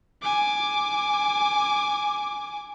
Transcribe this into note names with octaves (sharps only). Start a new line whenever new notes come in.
G#5 D6